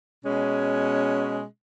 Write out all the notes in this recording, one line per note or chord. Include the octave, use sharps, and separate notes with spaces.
B2 G#3 C#4